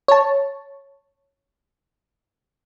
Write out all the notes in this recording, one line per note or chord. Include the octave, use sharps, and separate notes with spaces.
C#5 A5